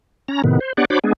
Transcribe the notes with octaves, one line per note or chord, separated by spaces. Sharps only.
C#4 A#5
A2 C3 D#3 B3
C5
B3 D4 G4 C#5 D5 F#5
D4 F#4 C5 C#5 B5 D6
G#3 B3 D4 G#4